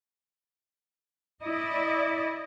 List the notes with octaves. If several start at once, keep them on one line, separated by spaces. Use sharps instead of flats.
E4 D5 D#5